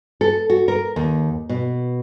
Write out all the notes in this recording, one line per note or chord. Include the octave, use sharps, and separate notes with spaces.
A4
F#4
A#4
D#2
B2